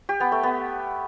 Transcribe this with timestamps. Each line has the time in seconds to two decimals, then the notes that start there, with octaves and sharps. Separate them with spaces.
0.09 G4
0.20 B3
0.32 A3
0.43 B3